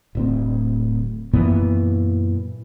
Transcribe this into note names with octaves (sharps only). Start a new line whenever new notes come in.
D1 D2 C4
F#2 A#2 E3 B3